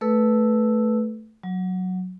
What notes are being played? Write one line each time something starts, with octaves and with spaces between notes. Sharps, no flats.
A3 A4 B4 E6
F#3